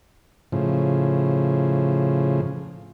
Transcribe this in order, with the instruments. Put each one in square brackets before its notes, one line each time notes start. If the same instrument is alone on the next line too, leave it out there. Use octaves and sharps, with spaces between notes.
[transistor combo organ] A2 C#3 F3